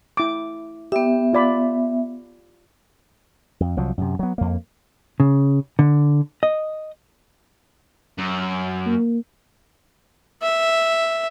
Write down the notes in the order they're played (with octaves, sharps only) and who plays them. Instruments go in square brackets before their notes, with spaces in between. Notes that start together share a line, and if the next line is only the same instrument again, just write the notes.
[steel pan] E4 D6
[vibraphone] B3 E5 [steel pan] G4
[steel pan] F4 D5 B5
[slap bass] F2
C2 F3 F#3
F#2 C3
F#3 B3
F2 A#3
[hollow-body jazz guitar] C#3
D3
D#5
[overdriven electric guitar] F#2
[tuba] A#3
[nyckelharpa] E5